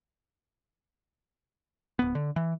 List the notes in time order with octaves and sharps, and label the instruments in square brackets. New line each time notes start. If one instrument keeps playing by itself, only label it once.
[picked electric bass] D1 B3
D3
E3